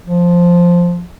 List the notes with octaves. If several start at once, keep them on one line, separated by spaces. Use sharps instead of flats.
F3